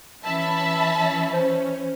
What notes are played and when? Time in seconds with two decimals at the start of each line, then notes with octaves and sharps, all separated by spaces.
0.24 E3 C#4 E5 A5 B5
1.33 C5